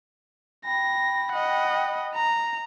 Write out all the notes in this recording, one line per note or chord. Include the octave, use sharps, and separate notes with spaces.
G5 B5 A#6
D#5 F#5
A#5